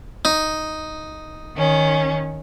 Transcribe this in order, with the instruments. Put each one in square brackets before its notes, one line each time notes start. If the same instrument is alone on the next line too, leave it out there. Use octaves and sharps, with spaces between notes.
[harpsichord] D#4
[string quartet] D#3 C#4